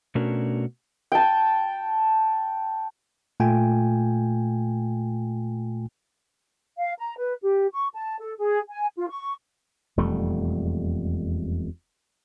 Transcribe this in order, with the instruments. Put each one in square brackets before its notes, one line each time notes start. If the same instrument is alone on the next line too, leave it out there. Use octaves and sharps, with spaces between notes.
[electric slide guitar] B2 A3 C#4 D4 F#4 A#4
[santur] G5 A5
[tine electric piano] A#2 A3 F4 G5 G#5
[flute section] F5
A#5
B4
G4
C#6
A5
A4
G#4
G#5
F4
C#6
[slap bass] E1 F2 G3 A3